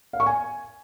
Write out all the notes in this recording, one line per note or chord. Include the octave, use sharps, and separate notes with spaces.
F5
C#6
G#5